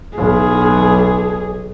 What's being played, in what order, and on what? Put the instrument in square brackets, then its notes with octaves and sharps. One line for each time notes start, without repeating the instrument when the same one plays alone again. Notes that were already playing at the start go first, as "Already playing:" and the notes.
[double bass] B1 [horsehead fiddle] G#4